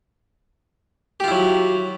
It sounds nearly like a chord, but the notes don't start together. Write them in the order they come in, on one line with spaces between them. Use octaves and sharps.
G4 F4 E4 F#3